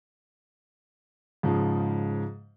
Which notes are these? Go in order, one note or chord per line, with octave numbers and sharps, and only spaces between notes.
G#2 C#3 F3